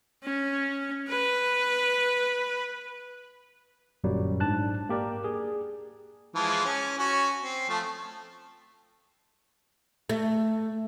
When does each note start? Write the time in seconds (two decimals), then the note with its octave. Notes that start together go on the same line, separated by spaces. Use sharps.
0.23 C#4
1.08 B4
4.04 G1 F#2 A#2 F#3 G3
4.40 G#2 D4 A5 F#6
4.89 A#3 G4 A#4 D5
5.24 G#4
6.35 E3 F3 G#3
6.65 C#4
6.98 C#4 F#4
7.43 C4
7.69 F3 A3
10.09 A3